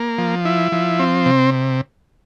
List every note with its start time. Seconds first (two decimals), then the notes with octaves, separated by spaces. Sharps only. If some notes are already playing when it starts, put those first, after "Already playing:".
Already playing: A#3
0.18 F3
0.45 E4
0.72 F3
0.99 C4
1.26 C3